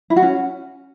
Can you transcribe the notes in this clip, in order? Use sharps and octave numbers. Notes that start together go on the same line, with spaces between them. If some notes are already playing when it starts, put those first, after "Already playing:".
E4
F#4
C#4